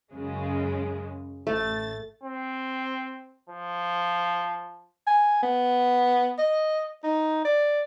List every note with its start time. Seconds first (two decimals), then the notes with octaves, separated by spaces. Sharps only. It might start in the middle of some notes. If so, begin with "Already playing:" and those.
0.12 F#2 C#3 G#3
1.47 A1 A3 A6
2.24 C4
3.50 F3
5.07 G#5
5.43 B3
6.39 D#5
7.04 D#4
7.45 D5